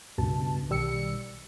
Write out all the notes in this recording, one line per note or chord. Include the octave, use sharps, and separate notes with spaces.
C#2 G2 B2 A5
B1 D#3 G3 E6 C#7